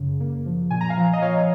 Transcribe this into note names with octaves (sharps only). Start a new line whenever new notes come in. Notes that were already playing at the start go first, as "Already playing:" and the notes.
Already playing: F#2 C#3
A#3
F3
A#2 G#5
A#5
F5 G#5
F3
D#5
A#2 C#5 F5